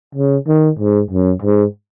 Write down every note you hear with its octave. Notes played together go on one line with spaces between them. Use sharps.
C#3
D#3
G#2
F#2
G#2